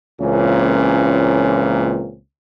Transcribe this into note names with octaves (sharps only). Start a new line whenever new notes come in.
C#2 A#2 E3 A#3 C4 C#4